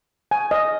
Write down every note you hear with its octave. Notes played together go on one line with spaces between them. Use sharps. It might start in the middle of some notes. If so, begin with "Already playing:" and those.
G#5
D#5